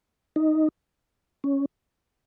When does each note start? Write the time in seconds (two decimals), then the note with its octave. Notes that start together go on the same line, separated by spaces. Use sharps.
0.36 D#4
1.44 C#4